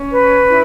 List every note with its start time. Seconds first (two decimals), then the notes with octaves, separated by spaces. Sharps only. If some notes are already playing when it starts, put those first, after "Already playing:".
Already playing: C#4
0.11 B4
0.49 E4